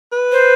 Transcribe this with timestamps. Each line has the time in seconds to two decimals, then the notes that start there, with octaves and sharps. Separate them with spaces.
0.12 B4
0.32 C5